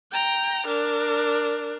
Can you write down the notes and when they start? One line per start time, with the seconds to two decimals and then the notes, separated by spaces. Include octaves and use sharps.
0.12 G5 A#5
0.67 D4 A#4